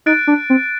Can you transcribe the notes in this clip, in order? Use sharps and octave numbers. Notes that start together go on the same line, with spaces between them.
D#4 F#6 A6 D7
D4
C4